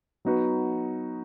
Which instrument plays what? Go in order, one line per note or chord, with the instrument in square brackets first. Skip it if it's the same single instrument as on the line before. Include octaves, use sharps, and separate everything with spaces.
[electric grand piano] F#3 B3 D#4 F#4 B4